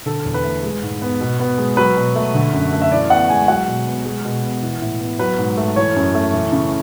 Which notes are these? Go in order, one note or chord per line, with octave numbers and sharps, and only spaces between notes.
D3 A4
E2
B4
A3
G#3
G#2
B3
B2
B3
G#3
F#3 B4
B2
A3
D3
F#2
A3
E5
E3 D5
B3 F#5
G#3 G#5
F#3 F#5
B2
B3
G#3
B2
B3
E3
A2
B3
F#3 B4
G#2
A3
E3 C#5
F#2
A3
E3
C#3